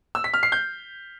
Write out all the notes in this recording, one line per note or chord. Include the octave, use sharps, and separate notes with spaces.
E6
B6
F6
C7
G6